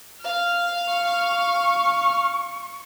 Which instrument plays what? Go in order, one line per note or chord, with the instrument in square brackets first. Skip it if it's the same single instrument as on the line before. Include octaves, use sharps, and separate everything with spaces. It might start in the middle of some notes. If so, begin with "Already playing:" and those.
[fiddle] F5 F6
[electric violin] C#6